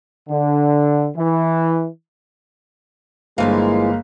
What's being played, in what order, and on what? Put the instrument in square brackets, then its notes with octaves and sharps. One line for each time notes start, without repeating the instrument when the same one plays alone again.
[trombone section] D3
E3
[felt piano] G1 F5 [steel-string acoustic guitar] E3 F3 E4 [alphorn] G#3 [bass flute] A#3